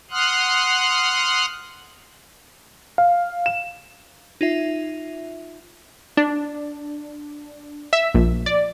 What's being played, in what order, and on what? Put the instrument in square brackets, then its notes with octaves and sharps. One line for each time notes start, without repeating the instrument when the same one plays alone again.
[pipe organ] F#5 C6 D#6 F6 F#6
[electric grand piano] F5
E7
[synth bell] D#4 F4 E5
[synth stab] D4
E5
A#1
D5